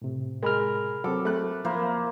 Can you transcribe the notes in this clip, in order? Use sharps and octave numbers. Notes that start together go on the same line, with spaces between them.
A2 C3
G#3 A#4 B5 F6
F#3 C4 A4 D6
A3 F#6
F3 A#3 E4 C5